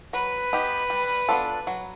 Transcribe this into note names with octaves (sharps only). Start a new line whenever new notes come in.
F#3 B4
B3 D#4 G4
G3
B3 D4 F4 A4
F#3